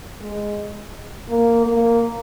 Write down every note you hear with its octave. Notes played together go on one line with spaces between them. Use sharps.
G#3
A#3
A#3